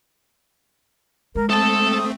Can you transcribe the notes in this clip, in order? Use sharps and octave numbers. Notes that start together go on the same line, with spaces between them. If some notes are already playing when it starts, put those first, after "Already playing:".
G#3 A#4
A3 C4 A4 A5 D#6